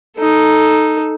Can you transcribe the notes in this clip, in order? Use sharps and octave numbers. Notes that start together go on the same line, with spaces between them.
D#4 A4